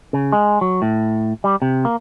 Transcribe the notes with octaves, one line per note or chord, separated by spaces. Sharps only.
C#3
G#3
F#3
A2
G3
C3
A#3